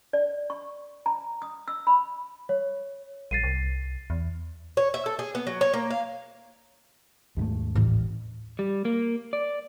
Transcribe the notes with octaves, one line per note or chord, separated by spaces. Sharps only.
D5
C#6
A#5
D#6
E6
B5
C#5
A#1 A6 C7 D#7
C2
E2
C#5
E5
A4
G#4
B3
F#3
C#5
A#3
F5
D#2 G#2 A3
A1
G3
A#3
D5